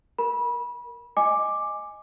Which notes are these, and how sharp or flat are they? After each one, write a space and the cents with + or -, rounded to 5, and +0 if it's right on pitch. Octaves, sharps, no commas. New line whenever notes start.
A#4 +0 B5 -30
D#5 +0 G#5 +0 D6 +5